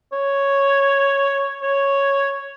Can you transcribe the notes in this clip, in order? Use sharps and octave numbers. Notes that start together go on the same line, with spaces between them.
C#5
C#5